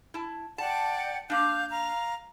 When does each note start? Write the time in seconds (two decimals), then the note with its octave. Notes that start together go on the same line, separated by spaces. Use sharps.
0.14 E4 A5
0.58 D5 F#5 G5 A5
1.30 A#3 D4 F5 G6
1.69 F5 A#5